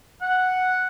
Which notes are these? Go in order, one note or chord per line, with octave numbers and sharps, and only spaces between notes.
F#5